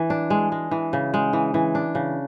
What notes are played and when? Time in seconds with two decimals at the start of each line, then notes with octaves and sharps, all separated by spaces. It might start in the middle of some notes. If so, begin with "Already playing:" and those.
Already playing: E3
0.10 D4
0.30 G#3
0.52 G#3
0.71 E3
0.93 C#3
1.14 G#3
1.33 E3
1.54 E3
1.75 D4
1.95 C#3